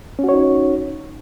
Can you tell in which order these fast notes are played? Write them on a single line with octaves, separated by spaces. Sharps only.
C#4 F#4 C#5 D#4